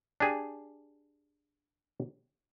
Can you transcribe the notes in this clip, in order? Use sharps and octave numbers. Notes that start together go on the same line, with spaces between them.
D4 G4 G#4